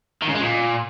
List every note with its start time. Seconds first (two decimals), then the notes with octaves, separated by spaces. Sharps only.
0.22 D#3
0.29 C#3
0.35 G#3
0.41 A#2